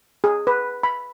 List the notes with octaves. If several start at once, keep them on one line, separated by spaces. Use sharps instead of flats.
G#4
B4
B5